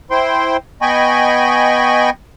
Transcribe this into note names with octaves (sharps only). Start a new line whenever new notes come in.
E4 C5 G5 C6
B3 D#5 G5 G#5 B5 C#6